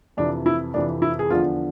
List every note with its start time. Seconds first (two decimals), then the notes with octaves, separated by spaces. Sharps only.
0.17 F2 C3 E3 D4
0.46 E4
0.74 F2 C3 E3 D4
1.02 E4
1.19 G#4
1.30 E2 D3 F3 F4